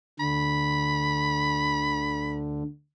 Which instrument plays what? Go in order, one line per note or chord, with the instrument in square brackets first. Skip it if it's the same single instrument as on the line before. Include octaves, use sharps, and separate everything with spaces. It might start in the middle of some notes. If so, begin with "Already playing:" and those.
[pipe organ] D2 D3 [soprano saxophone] B5